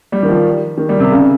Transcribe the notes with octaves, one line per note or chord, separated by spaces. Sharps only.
G3
D#3
F3
D#3
G3
C3
C#3